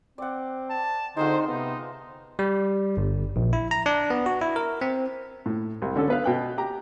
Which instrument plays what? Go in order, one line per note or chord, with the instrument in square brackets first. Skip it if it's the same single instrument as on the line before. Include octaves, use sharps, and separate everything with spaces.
[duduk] C4 [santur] D5 F#5
[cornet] A5
[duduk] D3 [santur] G#3 C4 F4 [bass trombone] D#4 [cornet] C5
[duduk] C3 [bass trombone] B3 [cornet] D#4
[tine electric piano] G3
G1
A#1
E4
A#5
D4
B3
F#4
E4
A#4
C4
[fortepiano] A2
C2
D3 C#4 A4
B3 B4 F5
B2 G5 F#6
G4 A#5